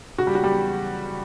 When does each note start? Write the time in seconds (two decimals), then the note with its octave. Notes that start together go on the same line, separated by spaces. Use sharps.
0.18 C#3 F#4
0.27 G3 G4
0.35 F#3 F#4
0.44 G3 G4
0.51 E2